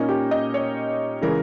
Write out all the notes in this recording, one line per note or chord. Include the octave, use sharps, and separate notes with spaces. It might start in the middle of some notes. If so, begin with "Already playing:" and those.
Already playing: A#2 A#3 C#4 D#4
G4
D#5
C#5
C#3 E3 G#3 A#4